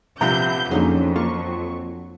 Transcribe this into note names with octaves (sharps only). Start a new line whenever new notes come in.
A#1 C3 B3 E5 A#5 G6
F2 D3 F#3 A#3 C#4 D#4 G#4
A#3 F4 A4 C#6